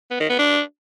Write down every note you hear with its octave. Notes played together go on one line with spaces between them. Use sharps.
B3
D#3
B3
D4